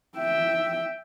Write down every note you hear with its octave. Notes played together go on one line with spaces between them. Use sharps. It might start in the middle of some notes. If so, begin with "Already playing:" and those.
E5 G5